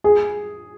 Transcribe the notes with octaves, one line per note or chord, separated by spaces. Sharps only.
G#4